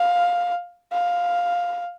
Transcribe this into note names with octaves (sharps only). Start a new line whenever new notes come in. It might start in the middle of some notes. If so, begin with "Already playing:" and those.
Already playing: F5
F5